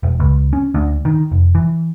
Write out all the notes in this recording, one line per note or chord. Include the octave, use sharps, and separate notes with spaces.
E1
C#2
C#4
D2
D#3
F1
E3